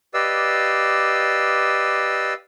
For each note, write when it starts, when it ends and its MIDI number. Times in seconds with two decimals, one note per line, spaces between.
0.14 2.34 67
0.14 2.34 71
0.14 2.34 74
0.14 2.34 75
0.14 2.34 77
0.14 2.34 88